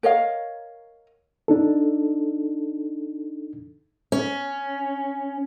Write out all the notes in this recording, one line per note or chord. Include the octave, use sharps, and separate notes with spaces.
A#4 C#5 D#5 F5
D4 D#4 A4
C#4